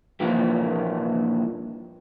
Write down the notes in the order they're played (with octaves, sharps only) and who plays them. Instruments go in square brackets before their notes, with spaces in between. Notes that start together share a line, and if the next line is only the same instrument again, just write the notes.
[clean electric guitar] G2 A#2 E3 F3 A#3